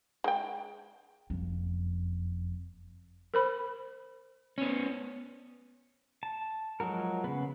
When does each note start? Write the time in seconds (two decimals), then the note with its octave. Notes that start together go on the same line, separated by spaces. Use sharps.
0.24 G#3 G5
1.30 F#1 F2
3.34 A#4 C5 B5
4.58 B3 C#4
6.23 A5
6.80 F3 F#3 G#3 F#4 A#4
7.24 C#3 B3